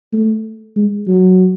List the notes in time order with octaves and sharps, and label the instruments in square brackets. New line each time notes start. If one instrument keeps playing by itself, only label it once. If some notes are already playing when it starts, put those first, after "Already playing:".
[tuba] A3
G#3
F#3